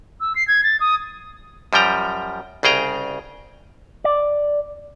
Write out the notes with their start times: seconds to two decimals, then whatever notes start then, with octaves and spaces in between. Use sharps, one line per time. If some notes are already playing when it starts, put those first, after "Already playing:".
0.21 E6
0.36 C7
0.48 G#6
0.64 A6
0.80 D#6
1.73 F#2 F3 G3 G5 A#5
2.63 C2 C#3 G#4 G5 A#5
4.04 D5